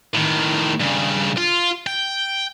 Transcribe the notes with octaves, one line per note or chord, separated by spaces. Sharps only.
A2 D#3
G2 C#3
F4
G5